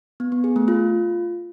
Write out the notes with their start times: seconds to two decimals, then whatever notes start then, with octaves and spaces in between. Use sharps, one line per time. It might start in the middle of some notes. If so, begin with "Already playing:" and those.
0.20 B3
0.32 B3
0.44 G#4
0.56 A3
0.68 F4